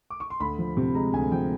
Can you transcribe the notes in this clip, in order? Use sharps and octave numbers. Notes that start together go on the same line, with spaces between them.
D6
C#6
C6
D2 B5
F3
C3
G#3 A#5
D2 G#5
F3 G5